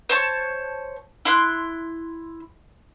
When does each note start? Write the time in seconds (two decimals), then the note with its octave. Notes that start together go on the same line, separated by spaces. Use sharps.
0.09 C5 C#5 A5 C#6
1.25 E4 C6 F#6